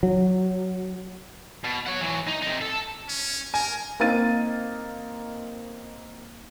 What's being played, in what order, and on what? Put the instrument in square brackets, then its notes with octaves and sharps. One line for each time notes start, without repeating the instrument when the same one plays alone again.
[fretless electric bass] F#3
[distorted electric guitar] B2
C#5 F#5
E3 F#3
D#4
C3 D#4
A4
[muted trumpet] C#4
[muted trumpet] A#4 [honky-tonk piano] G#5
[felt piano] A#3 C4 D#4 F5 A6 D#7